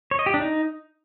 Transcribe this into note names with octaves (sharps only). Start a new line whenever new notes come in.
C#5
D#5
G4
D4
D#4